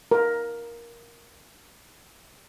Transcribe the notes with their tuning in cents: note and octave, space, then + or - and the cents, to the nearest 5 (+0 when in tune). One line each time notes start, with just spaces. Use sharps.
A#4 +10